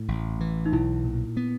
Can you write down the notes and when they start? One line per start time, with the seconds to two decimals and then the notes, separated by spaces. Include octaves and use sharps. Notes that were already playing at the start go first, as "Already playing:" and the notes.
Already playing: A2
0.08 A1
0.40 E3
0.66 D#4
0.73 B1 E4
1.04 A#2
1.37 B3